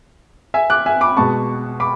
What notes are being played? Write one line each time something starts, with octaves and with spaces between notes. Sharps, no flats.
E5 G#5
D6 F#6
E5 G#5
B5 D6
B2 G#3 B3 A5 C#6
B5 D6